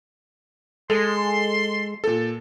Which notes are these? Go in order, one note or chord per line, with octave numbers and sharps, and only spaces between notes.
G#3 A4 C6
A#2 A4